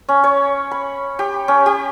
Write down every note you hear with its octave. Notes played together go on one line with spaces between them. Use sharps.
C#4
C#5
B5
G4
C#4
G4